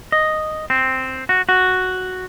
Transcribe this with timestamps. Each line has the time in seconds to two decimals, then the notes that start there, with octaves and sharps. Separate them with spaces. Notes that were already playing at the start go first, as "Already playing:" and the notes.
0.12 D#5
0.70 C4
1.29 F#4
1.49 F#4